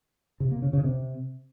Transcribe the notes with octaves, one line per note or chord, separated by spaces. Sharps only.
C3
A#3
C#3
C#3
C3